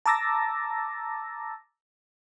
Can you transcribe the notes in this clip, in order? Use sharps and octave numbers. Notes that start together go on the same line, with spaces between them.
A5 A#5 D6 E6 A6 A#6